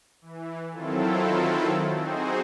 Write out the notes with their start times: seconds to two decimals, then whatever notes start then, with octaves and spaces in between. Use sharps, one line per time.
0.22 E3
0.72 D#3 F#3 C4 E4 F4 A4
1.94 C4 D#4 F#4 G#4 C5